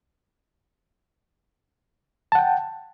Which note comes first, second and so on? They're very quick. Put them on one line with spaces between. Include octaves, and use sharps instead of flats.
A5 F#5 G5